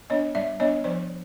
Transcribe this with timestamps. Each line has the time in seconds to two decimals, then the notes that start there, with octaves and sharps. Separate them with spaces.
0.10 B3 D4 C#5 D#5
0.35 G3 D5 E5
0.60 B3 D4 C#5 D#5
0.84 F3 C5 D5